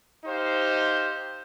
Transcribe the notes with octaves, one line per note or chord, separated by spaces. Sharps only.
D#4 G4 C5 F5